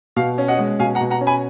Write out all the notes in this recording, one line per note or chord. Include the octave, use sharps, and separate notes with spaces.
B2 F5
C#4
D#5 F#5
G#3
B2 F5 G#5
F#5 A#5
B2
F#5 A#5
C#4
G#5 B5